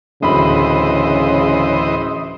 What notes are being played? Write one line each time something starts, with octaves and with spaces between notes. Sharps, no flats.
D1 C#3 E3 C5 D#5 B5